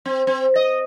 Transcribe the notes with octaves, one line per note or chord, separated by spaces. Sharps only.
C4
C4
D#5